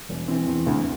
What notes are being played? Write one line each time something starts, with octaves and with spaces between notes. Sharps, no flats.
E1
E3 C4
E2
D2